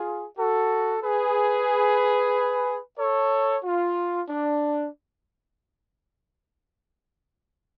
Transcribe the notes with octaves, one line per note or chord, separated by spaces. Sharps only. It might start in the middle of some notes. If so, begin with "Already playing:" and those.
Already playing: F4 G#4
F#4 A4
G#4 B4
A4 C#5
F4
D4